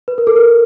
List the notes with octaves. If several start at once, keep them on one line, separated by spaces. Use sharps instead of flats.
B4
A#4
A4
A#4